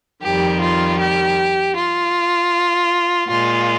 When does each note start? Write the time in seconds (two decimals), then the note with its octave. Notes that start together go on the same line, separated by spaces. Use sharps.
0.23 F2 D#3 G3 G4
0.62 F4
1.00 G4
1.76 F4
3.29 A#2 G#3 F4